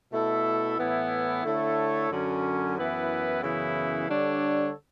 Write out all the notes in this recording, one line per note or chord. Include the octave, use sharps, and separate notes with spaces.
B2 A3 E4 A4
A2 E3 B3 E4
D3 A3 E4 A4 C#5
F#2 D3 F#3 C#4
F#2 E3 B3 E4 B4
F#2 C#3 E3 B3 E4
D3 G3 D4 A4 C#5